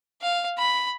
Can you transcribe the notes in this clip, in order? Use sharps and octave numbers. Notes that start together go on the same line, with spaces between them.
F5
B5